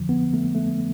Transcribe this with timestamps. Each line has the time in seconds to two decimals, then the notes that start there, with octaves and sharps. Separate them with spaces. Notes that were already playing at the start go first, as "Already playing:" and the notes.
Already playing: F2 D3 F3
0.09 B3
0.34 A3
0.55 A3